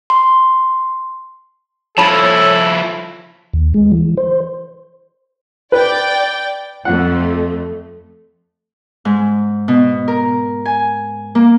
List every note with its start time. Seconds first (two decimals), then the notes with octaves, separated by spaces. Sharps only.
0.10 C6
1.98 F3 E4 A4 C#5 A5 B5
3.53 D#2
3.74 G#3
3.92 E3
4.17 C5
5.72 B4 D5 G5
6.85 F2 A3 F#5
9.05 G#2
9.68 B2
10.08 A#4
10.65 G#5
11.35 A#3